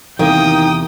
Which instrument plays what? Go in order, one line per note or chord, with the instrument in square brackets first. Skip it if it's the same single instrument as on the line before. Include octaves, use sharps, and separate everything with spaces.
[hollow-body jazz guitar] E2 C3 E4 [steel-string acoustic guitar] D#3 A#3 [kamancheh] G5 D#6